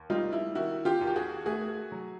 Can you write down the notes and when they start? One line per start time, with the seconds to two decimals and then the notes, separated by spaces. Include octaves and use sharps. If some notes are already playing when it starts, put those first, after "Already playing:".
Already playing: D#2
0.10 G3 D#4 F4
0.32 E4
0.55 D#3 E4 F#4
0.85 F4 G4
1.01 D#2
1.07 G4
1.16 F#4 G#4
1.46 A3 F#4 G#4
1.92 F#3